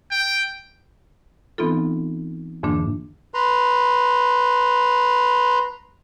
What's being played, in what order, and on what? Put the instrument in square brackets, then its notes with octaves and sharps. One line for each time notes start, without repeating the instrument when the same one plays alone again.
[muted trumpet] G5
[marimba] E3 B3 C4 D#4 F4 A4
F2 G#2 D3 E3 A#3 D4
[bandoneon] B4 A#5 C6